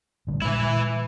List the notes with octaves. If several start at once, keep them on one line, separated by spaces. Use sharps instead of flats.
A1 D3 G3
A#2 E3 G#3 E4